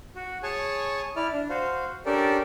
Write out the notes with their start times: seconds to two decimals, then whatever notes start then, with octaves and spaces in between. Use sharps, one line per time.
0.15 F#4
0.43 G#4 C#5 G#5 A5 C#6
1.16 E4 D5 F6
1.32 D4
1.50 F#4 C5 F5
2.06 C#4 D4 G4 A4 A#4 D5